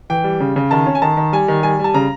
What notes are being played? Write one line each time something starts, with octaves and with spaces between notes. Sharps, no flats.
E3 G5
G3
C#3
C#3
D#3 A5
C#4
G#5
D#3 A5
D#3
G3 G#5
D#3
G3 G#5
G3 A5
C#3 A#5